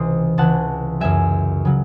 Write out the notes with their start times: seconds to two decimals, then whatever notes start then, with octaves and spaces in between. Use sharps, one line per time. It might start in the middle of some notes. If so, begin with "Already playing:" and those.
Already playing: C#2 C3 E3 C5 D#5
0.38 C#2 C3 E3 F#5 A5
1.00 F#2 C#3 F#3 E5 G#5
1.65 C#3 F#3